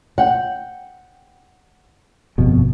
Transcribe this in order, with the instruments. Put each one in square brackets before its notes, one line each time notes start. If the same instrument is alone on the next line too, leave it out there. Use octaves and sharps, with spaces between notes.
[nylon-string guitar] F#5 G5
[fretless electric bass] G1 F2 B2